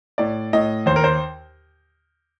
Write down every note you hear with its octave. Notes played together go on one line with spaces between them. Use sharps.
A2 D5
A2 D#5
D#2 C5
A#4
C5